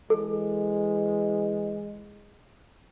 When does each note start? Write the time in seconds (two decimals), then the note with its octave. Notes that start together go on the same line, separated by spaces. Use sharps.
0.10 E3 G#3 A4